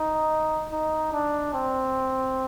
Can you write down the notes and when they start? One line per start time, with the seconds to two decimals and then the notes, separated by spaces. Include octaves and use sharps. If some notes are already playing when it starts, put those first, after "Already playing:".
Already playing: D#4
0.72 D#4
1.13 D4
1.54 C4